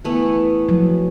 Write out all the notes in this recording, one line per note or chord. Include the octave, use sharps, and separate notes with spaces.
E3 A3 B3
F3 F#3